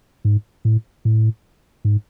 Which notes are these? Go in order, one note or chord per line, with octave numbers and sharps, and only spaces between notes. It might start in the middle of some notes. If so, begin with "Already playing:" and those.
G#2
A2
A2
G#2